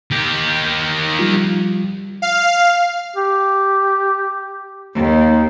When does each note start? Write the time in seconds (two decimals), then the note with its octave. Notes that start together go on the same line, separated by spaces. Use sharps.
0.11 D#3 G4
1.19 F3 G3 F4
2.22 F5
3.16 G4
4.96 D#2 D#4